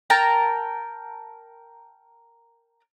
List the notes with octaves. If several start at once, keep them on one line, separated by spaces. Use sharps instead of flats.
A#4 G5 A5 A#5